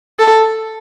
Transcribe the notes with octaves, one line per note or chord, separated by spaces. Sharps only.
A4